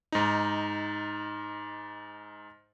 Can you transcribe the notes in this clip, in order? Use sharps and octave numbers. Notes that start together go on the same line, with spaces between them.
G#2 D#4